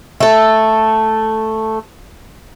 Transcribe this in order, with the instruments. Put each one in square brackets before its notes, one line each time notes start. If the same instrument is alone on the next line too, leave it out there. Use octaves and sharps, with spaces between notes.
[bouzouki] A3 A4